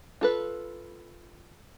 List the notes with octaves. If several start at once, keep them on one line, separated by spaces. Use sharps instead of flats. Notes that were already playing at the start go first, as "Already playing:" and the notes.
F4 A4 B4